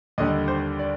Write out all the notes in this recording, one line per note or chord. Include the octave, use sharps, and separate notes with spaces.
D#2 D3 G3 D#5
C5
D5